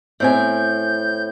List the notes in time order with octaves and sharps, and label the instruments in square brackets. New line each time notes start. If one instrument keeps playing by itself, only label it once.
[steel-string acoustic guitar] A2 C4 G#5 [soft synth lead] G6